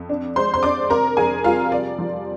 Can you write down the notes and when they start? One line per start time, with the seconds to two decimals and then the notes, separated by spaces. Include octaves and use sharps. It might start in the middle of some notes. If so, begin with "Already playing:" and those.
Already playing: F2
0.09 D4
0.36 G#3 C5 C6
0.54 C6
0.63 D4 D5 D6
0.90 C3 A#4 A#5
1.17 F2 G#4 G#5
1.44 G3 F4 F5
1.71 C3 D5
1.99 F3